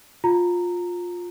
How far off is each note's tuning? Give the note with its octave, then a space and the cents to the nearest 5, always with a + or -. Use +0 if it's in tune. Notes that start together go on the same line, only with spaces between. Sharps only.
F4 +15 A#5 -15